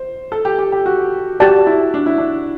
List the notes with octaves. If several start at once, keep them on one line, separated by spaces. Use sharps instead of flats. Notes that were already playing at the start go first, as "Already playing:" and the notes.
Already playing: C5
A4
G4
G4
G4
F#4
F#4 G4 D5 A5
E4
D4
E4
D4